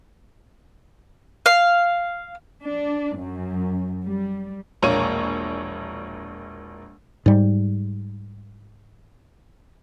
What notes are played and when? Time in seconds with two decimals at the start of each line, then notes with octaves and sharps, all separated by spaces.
1.46 F5
2.61 D4
3.15 F#2
4.04 G3
4.82 E1 A#1 A#3 C#5 C#6 D#7
7.26 G#2 G3